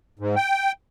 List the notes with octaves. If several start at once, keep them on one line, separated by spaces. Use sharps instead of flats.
G#2
G5